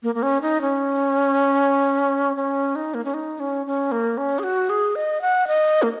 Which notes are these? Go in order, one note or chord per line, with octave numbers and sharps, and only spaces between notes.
A#3
A#3
C#4
D#4
C#4
C#4
D#4
A#3
C#4
D#4
C#4
C#4
A#3
C#4
G#4
F#4
G#4
D#5
F#5
D#5
A#3